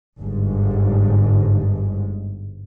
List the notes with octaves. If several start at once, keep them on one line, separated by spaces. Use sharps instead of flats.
G1 G#2